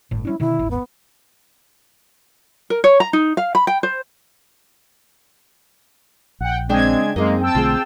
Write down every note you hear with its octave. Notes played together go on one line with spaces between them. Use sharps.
G1 A2
G3 C#4 D4 E4
B2 D3 D#3 E4
D#1 G#1
B3
A#4
C#5
A#5
D#4
F5
B5
G5
C5
A#1 F#5 G5
C#3 G#3 C4 D4 G5 G#6
F#2 G#3 A#3 C4 D#4 G#4
G5 A5 E6
B1 D3 A3 F4 G#4